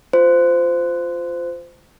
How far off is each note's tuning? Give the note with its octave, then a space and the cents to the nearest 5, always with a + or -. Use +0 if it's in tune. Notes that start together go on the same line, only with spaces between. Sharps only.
F4 +0 C5 -20